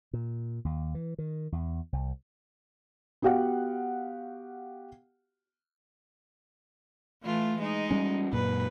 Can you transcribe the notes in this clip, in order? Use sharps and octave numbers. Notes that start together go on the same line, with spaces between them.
A#2
D#2
E3
D#3
E2
C2
B3 F#4 G4 F5 F#5
E3 A3 F4
G#3 D#4
G3 C#4
F#2 A#2 B4